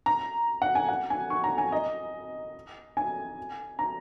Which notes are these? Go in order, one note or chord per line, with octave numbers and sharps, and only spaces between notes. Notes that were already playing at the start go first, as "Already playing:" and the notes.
A#5
F#5
G#5
F#5
G#5
C#6
A#5
G#5
D#5
G#5
A#5